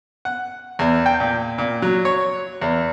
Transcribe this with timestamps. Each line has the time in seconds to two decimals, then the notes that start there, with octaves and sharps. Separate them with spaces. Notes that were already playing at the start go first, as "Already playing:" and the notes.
0.25 F#5
0.79 E2
1.06 G5
1.20 A#2
1.58 A#2
1.82 F#3
2.05 C#5
2.62 E2